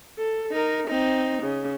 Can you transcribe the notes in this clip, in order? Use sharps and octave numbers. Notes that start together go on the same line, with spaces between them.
A4
D#4 A#4
C4 D#4
C#3